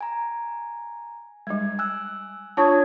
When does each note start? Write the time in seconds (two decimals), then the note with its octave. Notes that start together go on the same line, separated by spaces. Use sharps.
0.01 G#5 A#5
1.47 G3 G#3 G#6
1.79 G#5 E6 F#6
2.57 D4 F4 C#5 A5 D#6 G#6